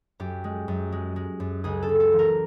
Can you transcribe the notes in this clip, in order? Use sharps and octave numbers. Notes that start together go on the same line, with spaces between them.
F#2 G4
G#3
F#2
G#3
G#3
F#2
C#2 G#4
A4
C#2
A4
E3
A#4